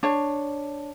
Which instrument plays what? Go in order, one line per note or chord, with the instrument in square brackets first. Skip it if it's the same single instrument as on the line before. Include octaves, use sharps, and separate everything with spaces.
[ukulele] D4 C#5